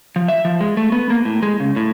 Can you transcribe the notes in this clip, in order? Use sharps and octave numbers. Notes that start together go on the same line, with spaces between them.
F3
E5
F3
G#3
A3
B3
A#3
A2
G#3
C#3
A2